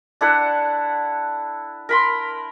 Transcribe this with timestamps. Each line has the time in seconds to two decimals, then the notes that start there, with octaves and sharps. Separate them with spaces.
0.21 D4 E4 A4 F#5
1.89 A#4 B5 C6